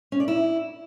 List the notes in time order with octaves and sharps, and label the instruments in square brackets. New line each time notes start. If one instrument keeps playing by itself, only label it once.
[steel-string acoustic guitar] C#4
D5
E4